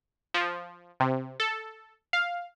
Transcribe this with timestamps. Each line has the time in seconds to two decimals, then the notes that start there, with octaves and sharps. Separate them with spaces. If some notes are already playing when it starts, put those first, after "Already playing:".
0.34 F3
1.00 C3
1.40 A4
2.13 F5